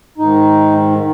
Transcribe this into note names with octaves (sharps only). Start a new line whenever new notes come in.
G#2 D#3 D#4
D#3